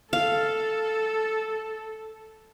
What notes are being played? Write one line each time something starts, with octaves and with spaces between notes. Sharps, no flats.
A4 F5